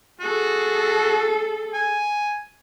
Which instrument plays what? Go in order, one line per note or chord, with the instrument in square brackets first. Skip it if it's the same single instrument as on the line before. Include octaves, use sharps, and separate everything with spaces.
[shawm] F#4 [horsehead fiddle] G#4 A4
[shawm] G#5